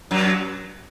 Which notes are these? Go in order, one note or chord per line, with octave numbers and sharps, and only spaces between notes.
F#2 F#3